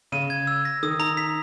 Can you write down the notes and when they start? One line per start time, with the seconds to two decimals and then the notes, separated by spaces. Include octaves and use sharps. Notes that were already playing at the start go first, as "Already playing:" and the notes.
0.12 C#3 D#7
0.30 G#6
0.47 E6
0.65 A#6
0.83 D#3 D#6
1.00 A#5
1.17 B6